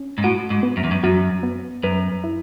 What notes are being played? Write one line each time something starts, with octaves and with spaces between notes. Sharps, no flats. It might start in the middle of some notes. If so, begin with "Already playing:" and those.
Already playing: C#4
G#2
A2 F#4
G#2
B3
F#2
E2
F#2
F#2 F#4
B3
F#2 B4
E4